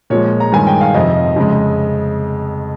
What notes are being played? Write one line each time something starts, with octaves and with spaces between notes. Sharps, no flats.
A#2 F3 G#3 C#5
A#5
G2 D#3 G#3 G#5
G5
F5
F2 C3 F3 D#5
F2 C#3 G#3